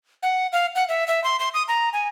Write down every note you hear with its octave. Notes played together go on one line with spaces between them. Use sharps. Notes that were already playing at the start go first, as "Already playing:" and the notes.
F#5
F5
F#5
E5
E5
C6
C6
D#6
A#5
G#5